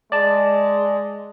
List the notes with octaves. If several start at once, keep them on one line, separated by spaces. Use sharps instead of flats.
G#3 D5 A5